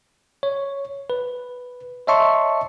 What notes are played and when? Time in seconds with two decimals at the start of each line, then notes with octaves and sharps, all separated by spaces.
0.43 C#5
1.10 B4
2.07 C#5 D#5 E5 A5 C6 C#6